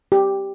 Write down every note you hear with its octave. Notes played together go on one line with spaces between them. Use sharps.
G4